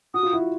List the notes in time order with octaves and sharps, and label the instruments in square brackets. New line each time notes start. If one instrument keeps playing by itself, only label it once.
[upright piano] F#4 [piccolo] D#6
[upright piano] F4
E4 F#4